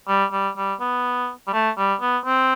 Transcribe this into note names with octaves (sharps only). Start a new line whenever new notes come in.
G3
G3
G3
B3
G3
A3
G3
B3
C4